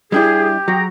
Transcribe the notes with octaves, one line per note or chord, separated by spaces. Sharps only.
G3 D4 E4 G4 G#4
F#3 G#4 G5 A#5